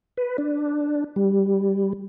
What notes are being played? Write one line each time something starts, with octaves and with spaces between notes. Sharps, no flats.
B4
D4
G3